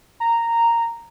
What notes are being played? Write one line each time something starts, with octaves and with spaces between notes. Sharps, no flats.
A#5